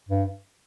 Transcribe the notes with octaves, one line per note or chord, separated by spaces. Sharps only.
G2